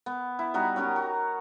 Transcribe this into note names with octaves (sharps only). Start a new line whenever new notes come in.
B3
E4
G3 B3 D#4 F#4
C#4 F#4 G4 A#4
F#4